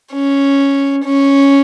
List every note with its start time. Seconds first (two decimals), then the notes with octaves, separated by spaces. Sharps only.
0.13 C#4
1.05 C#4